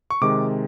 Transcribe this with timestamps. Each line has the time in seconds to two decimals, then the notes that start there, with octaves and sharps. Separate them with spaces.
0.10 C#6
0.21 C3 D#3 G#3 D6